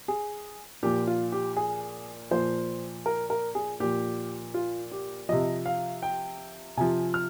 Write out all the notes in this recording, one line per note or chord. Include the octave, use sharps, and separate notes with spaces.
G#4
A#2 F3 G4
F4
G4
G#4
A#2 F3 C5
A#4
A#4
G#4
A#2 F3 G4
F4
G4
C3 F3 D#5
F5
G5
C3 F3 G#5
F6